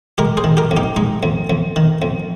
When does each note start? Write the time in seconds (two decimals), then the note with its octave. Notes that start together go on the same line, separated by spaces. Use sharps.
0.18 G#3 G4 A#4
0.37 G#4 C5
0.44 D#3
0.57 G4 A#4
0.71 F2
0.77 D#4 G4
0.96 G#3 D#4
1.23 F2
1.50 F2
1.76 D#3
2.02 F2